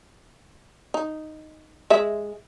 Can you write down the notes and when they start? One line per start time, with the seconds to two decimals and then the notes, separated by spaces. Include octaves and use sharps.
0.94 D#4
1.90 G#3 E5